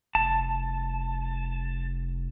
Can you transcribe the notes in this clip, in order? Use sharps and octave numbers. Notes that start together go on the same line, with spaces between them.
F1 A5